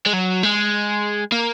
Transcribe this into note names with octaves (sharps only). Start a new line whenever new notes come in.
G#3
F#3
G#3
A#3